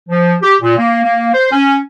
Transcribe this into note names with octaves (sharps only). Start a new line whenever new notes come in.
F3
G4
A#2
A#3
A#3
C5
C#4